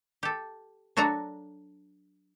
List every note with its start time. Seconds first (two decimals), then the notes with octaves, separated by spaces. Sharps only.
0.23 G4 A4
0.97 F#3 D4 F#4 A4 A#5